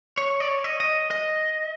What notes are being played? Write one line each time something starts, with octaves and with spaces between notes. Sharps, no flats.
C#5
D5
C#5
D#5
D#5
D#5